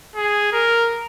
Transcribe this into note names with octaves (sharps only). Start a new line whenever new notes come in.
G#4
A#4